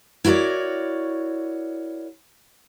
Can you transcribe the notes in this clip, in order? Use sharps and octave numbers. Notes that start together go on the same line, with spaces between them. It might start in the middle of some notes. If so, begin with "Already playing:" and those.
E4 F#4 A#4 C#5 D5